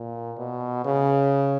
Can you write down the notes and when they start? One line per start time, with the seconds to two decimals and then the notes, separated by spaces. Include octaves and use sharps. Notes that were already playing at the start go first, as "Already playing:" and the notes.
Already playing: A#2
0.38 B2
0.85 C#3